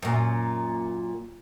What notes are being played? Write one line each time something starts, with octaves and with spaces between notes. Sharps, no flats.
F#2 A#2